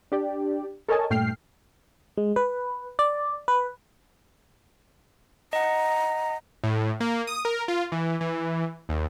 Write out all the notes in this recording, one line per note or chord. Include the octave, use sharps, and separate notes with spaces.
D4 G4 D5
A4 A#4 C#5 D#5 G#5 A5
G2 A#2 A3 G5 F6 C7
G#3
B4
D5
B4
D#5 F#5 A#5
A2
A#3
D#6
A#4
F4
E3
E3
D#2